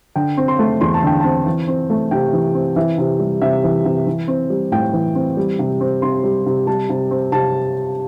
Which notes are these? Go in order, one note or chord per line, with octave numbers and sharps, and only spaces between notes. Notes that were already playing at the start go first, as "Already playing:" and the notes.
D3 G5
C4
C6
A3
E2 C6
A5
D3 G5
C4 A5
E3
C4
A3
C3 G5
E3
C4
E3 E5
C3
G3
C3 E5
E3
C3
E3
C4
G3
A2 G5
E3
C4
G3
C3
C4
C3 C6
G3
C3
G3 A5
C3
C4
C3 A5